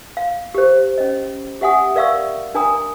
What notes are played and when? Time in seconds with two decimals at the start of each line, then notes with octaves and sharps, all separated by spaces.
0.17 F5
0.55 G4 C5
0.98 C#4 D#5
1.61 G4 E5 F#5 G#5 D#6
1.95 A#4 D5 E5 F5 C#6 E6
2.54 D4 A#4 G5 G#5 A#5 D#6